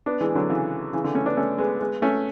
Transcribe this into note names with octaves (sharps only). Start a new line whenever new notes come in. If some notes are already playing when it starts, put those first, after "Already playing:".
B3 D4
E3 G#3
D3 F#3
C#3 E3
C#3 E3
D3
A3 C#4
B3 D4
A3 C#4
G#3 B3
G#3 B3
A3 C#4